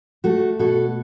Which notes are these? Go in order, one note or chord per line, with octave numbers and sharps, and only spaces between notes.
A3 F#4 A4
B2 F#4 A4